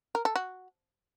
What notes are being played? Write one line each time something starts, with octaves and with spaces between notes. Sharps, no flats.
A#4
A4
F#4